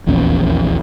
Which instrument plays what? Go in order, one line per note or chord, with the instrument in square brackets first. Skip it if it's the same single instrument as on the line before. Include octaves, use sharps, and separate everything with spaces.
[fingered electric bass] D#1 A#1 E2 C#4